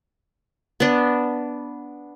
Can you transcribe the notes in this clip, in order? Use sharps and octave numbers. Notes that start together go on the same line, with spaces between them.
B3 D4